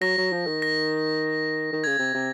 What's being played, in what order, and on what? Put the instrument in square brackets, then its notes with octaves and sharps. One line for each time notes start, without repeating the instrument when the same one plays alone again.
[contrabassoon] F#3 [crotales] A#6
[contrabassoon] F#3
F3
D#3
[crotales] A#6
[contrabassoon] D#3
[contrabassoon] C#3 [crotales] G#6
[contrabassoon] C3
C3